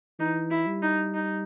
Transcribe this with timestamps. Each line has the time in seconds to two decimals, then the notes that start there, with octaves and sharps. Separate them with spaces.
0.19 E3 D#4
0.50 E4
0.67 G3
0.82 D#4
1.14 D#4